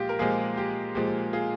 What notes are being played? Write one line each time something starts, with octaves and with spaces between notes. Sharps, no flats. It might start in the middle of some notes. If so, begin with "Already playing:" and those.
Already playing: A#2 F3 G#3 F4 G4
A#4
A#2 F3 G#3 F4 G#4
G4
A#2 F3 G#3 G4
F4 G#4